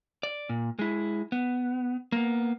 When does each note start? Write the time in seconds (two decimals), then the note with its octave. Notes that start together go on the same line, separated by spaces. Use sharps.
0.23 D5
0.49 A#2
0.79 G#3 E4
1.32 B3
2.12 A#3 B3